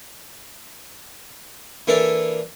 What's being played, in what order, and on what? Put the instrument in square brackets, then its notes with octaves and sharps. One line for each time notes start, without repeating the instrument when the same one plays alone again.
[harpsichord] E3 A#3 D4 A4 D5 E5